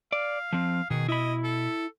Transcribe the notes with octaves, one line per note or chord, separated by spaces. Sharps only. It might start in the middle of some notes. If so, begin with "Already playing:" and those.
D5 F5
F3 C4
B2 D#3 G#4
E4 D#5 B5
A4